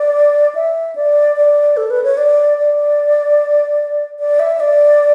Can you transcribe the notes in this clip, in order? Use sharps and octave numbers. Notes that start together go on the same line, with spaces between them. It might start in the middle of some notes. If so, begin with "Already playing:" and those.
Already playing: D5
E5
D5
D5
A4
B4
C#5
D5
D5
D5
E5
D5